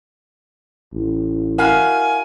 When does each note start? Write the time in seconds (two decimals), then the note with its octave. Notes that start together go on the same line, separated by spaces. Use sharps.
0.93 A1
1.58 E4 F#4 A#4 F5 G#5